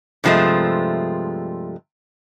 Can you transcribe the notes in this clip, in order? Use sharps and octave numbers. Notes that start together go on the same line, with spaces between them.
G2 C3 F3 G#3 A3